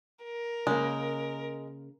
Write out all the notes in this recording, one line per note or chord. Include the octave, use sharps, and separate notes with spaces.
A#4
C#3 G#3 A#3